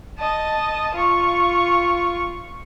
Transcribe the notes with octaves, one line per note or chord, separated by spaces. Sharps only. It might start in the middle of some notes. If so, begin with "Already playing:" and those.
D#5 A5
F4 C#6